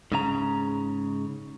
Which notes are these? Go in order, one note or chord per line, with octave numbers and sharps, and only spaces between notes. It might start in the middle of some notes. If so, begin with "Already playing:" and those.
G#2 C#3 A#5